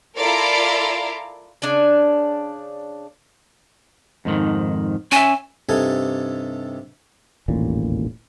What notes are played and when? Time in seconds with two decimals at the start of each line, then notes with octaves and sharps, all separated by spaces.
0.15 E4 F4 A4 A#4 D5
1.62 C#3 D4 D5 G#5
4.25 F2 G#2 D#3
5.12 C#4 E5 G#5
5.69 G2 C3 D#4 A4 G#5
7.48 E1 A1 D#2 A#2